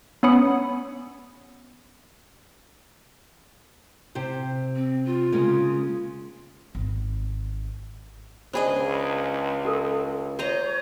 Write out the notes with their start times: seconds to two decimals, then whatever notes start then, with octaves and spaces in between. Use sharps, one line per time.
0.23 B3 C#4 C#5 B5 D#6 C#7
4.15 C3 G4 C5
4.76 C4
5.05 F4
5.32 C#3 G#3 A#3
6.75 G#1
8.53 C#2 D4 G#4 C5 D#5 B5
9.65 G4 A4 A#4
10.39 C5 C#5 D#5 A#5